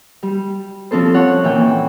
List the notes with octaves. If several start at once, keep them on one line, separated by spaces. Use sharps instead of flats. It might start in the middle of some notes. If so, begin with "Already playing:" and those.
G3
F3 C4 C#4 A4 C5
C#5 F#5
A#2 E3 G5